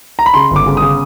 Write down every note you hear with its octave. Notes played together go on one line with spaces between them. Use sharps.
A#5
B5
C#3 C6
G1
D6
C#3
C#3 D#6